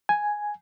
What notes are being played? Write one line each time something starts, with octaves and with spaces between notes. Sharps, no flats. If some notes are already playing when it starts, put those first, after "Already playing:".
G#5